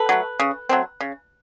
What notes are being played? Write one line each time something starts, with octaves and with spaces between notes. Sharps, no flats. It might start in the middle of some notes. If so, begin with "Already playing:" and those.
Already playing: A4 B4
F#3 A3
C#3
F#3 A3 C4
C#3